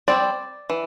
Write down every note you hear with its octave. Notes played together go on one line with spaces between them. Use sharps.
G3 C4 D5
E3